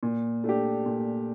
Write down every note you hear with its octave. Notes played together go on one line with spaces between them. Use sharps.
A#2
A3 D4 G4
A#2